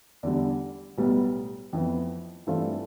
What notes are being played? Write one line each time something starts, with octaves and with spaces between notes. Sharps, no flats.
E2 D3 G3
B1 A2 G3 B3
F2 E3 B3
G2 E3 A3 C4 F4